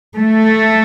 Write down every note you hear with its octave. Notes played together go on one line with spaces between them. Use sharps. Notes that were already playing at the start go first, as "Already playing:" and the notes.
A3